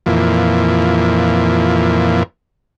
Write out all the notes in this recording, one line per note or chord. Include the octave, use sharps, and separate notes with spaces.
F2 A#2 E3